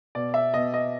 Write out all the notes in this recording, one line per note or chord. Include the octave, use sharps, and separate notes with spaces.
B2 D5
E5
B2 D#5
D#5